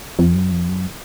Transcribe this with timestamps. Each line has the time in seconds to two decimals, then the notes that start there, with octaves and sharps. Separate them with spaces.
0.19 F2
0.35 F#2
0.52 F2
0.69 F#2